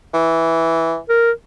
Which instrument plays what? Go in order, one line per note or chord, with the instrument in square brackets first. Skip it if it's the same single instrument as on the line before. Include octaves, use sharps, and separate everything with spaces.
[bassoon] E3
[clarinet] A#4